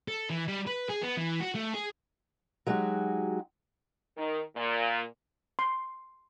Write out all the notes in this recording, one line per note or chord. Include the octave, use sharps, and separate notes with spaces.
A4
E3
G3
B4
G#4
B3
E3
F#4
A3
G#4
F#3 G#3 D#4 F#4 G4
D#3
A#2
C6